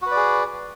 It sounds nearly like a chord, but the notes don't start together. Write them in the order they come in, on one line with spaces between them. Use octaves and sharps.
F#4 B4 D5 G#4